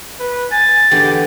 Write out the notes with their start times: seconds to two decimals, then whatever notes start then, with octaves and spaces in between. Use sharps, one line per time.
0.19 B4
0.51 G#5 A6
0.91 E2 D3 G4